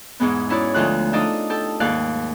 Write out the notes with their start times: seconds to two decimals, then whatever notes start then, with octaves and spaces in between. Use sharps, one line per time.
0.20 E2 G#2 G#3 B3
0.49 C#4 D#4 E4 F#4 C#5 D5
0.74 D2 F3 G#3 A3 F4 F#6
1.13 D4 D#4 F4 A4 D5 D#5
1.50 G4 A4
1.80 D#2 G#2 G3 D5 F5 F#6